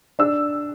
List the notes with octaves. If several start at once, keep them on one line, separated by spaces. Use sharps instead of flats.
D4 E6